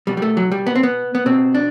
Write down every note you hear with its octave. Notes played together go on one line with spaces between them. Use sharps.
B2 G3
G3
A3
F#3
G3
B3
C4
B3
B3
B2 C4
D4